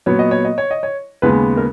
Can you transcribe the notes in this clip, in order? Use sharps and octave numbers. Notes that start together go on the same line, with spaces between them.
A#2 F#3 B3 C#5
D#5
C#5
D#5
C#5
D#5
C#5
D#2 C#3 G#3 B3 B4
A#4